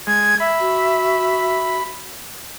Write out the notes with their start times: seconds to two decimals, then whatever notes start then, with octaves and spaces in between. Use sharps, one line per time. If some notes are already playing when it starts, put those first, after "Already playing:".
0.07 G#3 G#6
0.40 E5 B5
0.60 F#4